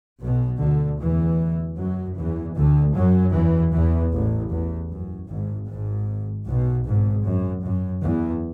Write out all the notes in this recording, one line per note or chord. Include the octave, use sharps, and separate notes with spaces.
B1 B2
D2 D3
E2 E3
F#2 F#3
E2 E3
D2 D3
F#2 F#3
E2 E3
E2 E3
A1 A2
E2
F#2
G#1 G#2
G#1 G#2
B1 B2
G#1 G#2
F#2
F#2
E2